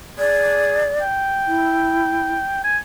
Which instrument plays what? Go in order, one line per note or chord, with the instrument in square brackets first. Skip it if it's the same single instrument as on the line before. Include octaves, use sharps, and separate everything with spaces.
[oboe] G#4 [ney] D5
[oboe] G5
[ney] E4
[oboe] G#5